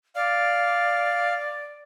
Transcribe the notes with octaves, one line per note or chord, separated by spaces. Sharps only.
D5 F5